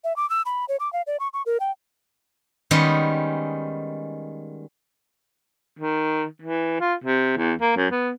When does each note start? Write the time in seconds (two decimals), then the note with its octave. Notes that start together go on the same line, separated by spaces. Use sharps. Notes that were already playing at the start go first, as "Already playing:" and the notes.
0.04 E5
0.16 D6
0.30 E6
0.46 B5
0.69 C#5
0.80 D6
0.93 F5
1.07 D5
1.20 C#6
1.34 C#6
1.46 A#4
1.60 G5
2.71 D#3 G3 G#3 B3 C#4
5.79 D#3
6.42 E3
6.80 F4
7.04 C3
7.37 E2
7.61 A#3
7.77 F#2
7.91 B3